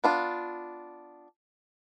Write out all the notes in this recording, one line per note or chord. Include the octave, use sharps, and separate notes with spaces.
B3 D4 F4